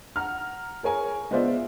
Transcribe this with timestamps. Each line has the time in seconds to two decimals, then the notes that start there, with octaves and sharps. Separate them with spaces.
0.16 F#5 A#5 F6
0.83 G#4 A#4 C#5 G#5 A#5
1.31 G#3 B3 F4 C5 D5 E5